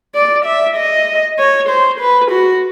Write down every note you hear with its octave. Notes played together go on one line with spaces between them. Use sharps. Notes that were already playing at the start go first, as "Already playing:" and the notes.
D5
E5
D#5
C#5
C5
B4
F#4